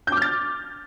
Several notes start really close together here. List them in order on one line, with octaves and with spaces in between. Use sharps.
G6 D6 F6 A6